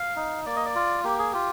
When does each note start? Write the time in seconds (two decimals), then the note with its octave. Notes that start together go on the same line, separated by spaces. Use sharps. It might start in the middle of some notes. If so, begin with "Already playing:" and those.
Already playing: F5
0.16 D#4
0.46 A#3 D5
0.56 D#5
0.66 D5
0.75 F4
1.04 A#3 G4
1.19 G#4
1.32 F4 G4